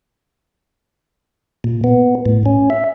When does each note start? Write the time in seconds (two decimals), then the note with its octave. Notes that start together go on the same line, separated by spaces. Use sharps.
1.64 A#2
1.84 B3
2.26 A2
2.46 C#4
2.70 E5